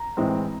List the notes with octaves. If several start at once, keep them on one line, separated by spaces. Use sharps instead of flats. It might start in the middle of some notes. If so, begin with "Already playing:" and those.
Already playing: A#5
A2 E3 G#3 C4